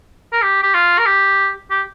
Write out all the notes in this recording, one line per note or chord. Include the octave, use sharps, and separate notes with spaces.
A#4
G4
G4
F4
A#4
G4
G4